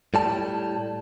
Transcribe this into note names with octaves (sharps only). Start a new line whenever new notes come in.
A2 G3 A5